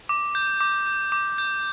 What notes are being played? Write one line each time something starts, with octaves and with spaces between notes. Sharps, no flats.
D6
G6
D6
G6
D6
G6